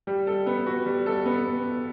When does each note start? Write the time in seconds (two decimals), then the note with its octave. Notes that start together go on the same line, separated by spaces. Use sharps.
0.07 G3
0.27 A4
0.46 B3
0.66 F#4
0.86 G3
1.06 A4
1.26 B3